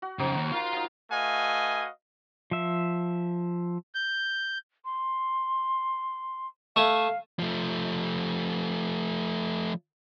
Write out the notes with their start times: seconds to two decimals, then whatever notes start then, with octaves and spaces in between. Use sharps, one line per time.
0.02 F#4
0.19 F2 C#3 D#4 F#4 C5
0.35 D#2
0.52 F4 A#4 F5 C6
0.73 F#3 D#4
1.10 A3 F#4 B4 D#5 F5 G#5
2.51 F3 E5
3.95 G6
4.85 C6
6.76 A3 E5 F5 G#5
7.39 F3 A3